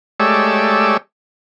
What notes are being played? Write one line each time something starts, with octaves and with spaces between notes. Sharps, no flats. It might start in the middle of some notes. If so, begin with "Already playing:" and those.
G#3 A3 G4 C#5 D5 E6